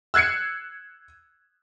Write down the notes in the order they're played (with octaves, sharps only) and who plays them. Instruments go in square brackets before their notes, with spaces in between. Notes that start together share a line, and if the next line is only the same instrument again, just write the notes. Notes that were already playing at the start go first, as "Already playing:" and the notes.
[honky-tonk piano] E6 F#6 G#6 C7 C#7